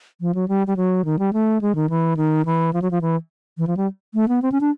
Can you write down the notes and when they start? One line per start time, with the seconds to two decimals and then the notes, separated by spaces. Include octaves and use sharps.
0.21 F3
0.35 F#3
0.48 G3
0.67 G3
0.77 F#3
1.05 D#3
1.19 G3
1.33 A3
1.61 G#3
1.75 D#3
1.90 E3
2.17 D#3
2.45 E3
2.73 F3
2.82 F#3
2.91 F3
3.01 E3
3.58 E3
3.67 F3
3.77 G3
4.14 A3
4.28 B3
4.42 C4
4.52 C#4
4.61 D4